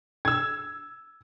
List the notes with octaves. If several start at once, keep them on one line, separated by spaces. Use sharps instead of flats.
E6 G#6